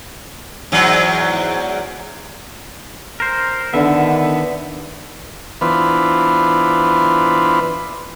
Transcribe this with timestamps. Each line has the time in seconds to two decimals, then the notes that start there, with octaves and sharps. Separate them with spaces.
0.72 E2 G#2 F#3
3.20 A#4 C5
3.74 D3 D#3 B3 D4 E5
5.61 E3 B3 D4 F4 B4 C5